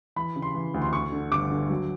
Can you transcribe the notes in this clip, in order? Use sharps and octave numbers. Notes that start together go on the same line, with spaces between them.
E3 B5
C#3
C6
E3
D2
C6
D3 C#6
D3
G1 D6
D3
F#3